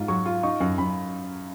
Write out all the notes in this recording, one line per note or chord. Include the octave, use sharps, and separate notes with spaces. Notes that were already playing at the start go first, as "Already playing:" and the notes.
Already playing: G#2 F4
F#3 C#6
F4
D#4 C#6
F#2
F#2 B5